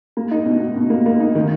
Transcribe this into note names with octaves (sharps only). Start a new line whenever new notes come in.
A#3
D#4
B2
B2
B2
A#3
A#3
D#4
D#3